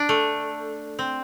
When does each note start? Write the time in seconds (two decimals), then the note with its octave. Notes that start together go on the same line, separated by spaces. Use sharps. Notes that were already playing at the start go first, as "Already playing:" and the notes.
Already playing: D4
0.09 A3
0.99 C4